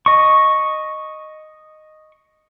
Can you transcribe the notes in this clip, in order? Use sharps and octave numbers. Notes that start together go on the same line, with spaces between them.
D#5 C#6